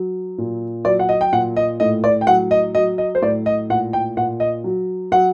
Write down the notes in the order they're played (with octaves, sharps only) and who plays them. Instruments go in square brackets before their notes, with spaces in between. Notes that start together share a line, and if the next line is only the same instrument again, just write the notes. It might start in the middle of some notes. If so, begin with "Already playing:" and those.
Already playing: [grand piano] F#3
A#2
F#3 D5
F#5
D#5
G5
A#2 F#5
D#5
A2 D#5
D5
G5
F#3 F#5
D#5
F#3 D#5
D#5
C5
A2 D5
D#5
A#2 F#5
G5
A#2 F#5
D#5
F#3
F#3 F#5